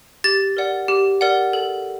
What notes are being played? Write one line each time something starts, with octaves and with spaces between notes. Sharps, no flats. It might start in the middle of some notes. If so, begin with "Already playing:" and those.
G4 A6
A#4 D5 F#5
G4
A#4 D5 F#5
A4